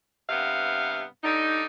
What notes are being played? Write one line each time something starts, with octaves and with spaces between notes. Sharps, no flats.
G2 C3 B3 F5 F#5
D3 G3 D#4